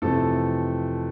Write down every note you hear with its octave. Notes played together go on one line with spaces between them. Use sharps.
F2 C3 E3 A3 A4